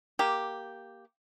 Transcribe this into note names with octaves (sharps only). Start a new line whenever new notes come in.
A#3 G4